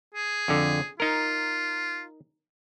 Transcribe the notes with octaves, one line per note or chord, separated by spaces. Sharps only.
G#4
F2 D3
D#4 F4 A#4